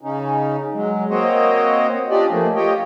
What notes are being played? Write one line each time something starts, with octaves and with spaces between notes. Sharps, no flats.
C#3 C#4 D#4
F#3 G#3
A#3 C4 F#4 C5 C#5 D#5
C#4 D4 F4 G4 D5 D#5
F3 A3 A#3
F4 G4 C#5 D#5 G5